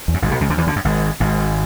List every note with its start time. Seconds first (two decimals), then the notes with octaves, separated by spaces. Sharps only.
0.08 E2
0.14 F#2
0.22 G#1 G#2
0.31 B1 B2
0.41 C#2 C#3
0.49 D2 D3
0.58 E2 E3
0.67 D2 D3
0.76 F#2
0.85 G#1 G#2
1.20 G#1 G#2